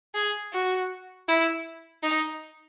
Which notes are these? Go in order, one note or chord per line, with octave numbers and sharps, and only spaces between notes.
G#4
F#4
E4
D#4